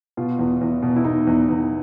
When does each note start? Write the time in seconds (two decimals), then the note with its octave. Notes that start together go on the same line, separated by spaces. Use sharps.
0.17 B2 F4
0.39 E2
0.61 E2
0.83 B2
0.96 E4
1.04 B2 D#4
1.27 E2
1.49 E2